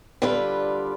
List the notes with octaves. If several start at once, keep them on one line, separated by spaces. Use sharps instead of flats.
D3 G3 D4 F4 B4